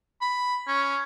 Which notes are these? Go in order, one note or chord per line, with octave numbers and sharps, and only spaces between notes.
B5
C#4